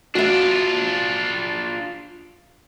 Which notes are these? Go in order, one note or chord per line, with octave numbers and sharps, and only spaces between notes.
D4 F4 F#4 E5